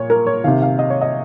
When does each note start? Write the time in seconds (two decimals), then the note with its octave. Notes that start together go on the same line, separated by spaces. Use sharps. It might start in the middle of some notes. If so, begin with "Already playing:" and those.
Already playing: A#2 C#5
0.10 A#4
0.27 C#5
0.44 C3 D#3 F5
0.62 F5
0.79 D#5
0.90 C#5
1.01 D#5